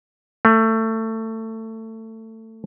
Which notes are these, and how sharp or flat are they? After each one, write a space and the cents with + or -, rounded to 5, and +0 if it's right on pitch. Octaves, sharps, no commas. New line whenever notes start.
A3 +20